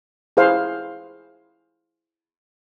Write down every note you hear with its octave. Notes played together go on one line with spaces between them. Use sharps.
E4 G#4 B4 C5 F5